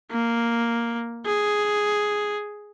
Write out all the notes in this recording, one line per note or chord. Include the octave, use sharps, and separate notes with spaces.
A#3
G#4